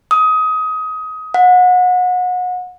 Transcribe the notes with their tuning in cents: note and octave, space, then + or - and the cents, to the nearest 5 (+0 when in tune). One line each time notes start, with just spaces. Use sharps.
D#6 +20
F#5 -30